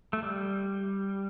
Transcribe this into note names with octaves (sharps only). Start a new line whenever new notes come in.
A3
G3